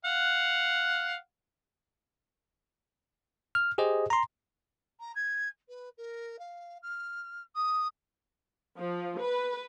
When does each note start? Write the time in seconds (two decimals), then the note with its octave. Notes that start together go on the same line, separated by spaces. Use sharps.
0.05 F5 F#5
3.55 F6
3.78 G4 G#4 C5 D#5
4.10 A#5 C6
5.00 A#5
5.15 G#6
5.68 B4
5.97 A#4
6.39 F5
6.82 F6
7.55 D#6
8.77 F3
9.18 B4